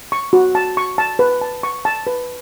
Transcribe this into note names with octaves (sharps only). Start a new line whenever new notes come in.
C#6
F#4
A5
C#6
A5
B4
A5
C#6
A5
B4